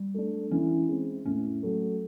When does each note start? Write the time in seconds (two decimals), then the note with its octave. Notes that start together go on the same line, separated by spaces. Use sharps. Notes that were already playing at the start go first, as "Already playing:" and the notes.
Already playing: G3
0.14 A3 D4
0.51 E3 C#4
0.89 G#3 C4
1.26 A2 C#4
1.63 F#3 A3